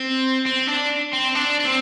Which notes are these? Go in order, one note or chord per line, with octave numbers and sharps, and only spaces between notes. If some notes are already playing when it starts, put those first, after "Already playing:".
Already playing: C4
C4
D4
C4
D4
D4
C4